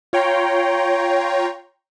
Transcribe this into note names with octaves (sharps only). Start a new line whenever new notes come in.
F4 C#5 G5 A#5 C6